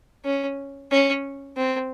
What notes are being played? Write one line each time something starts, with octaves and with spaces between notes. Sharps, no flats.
C#4
C#4
C4